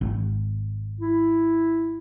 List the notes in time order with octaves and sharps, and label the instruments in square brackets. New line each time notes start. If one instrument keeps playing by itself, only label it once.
[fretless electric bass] G#1
[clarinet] E4